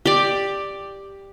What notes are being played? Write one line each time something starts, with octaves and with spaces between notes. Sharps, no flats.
G4 D5